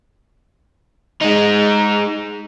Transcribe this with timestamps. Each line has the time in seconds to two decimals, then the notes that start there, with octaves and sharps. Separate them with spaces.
1.22 G#3 D#4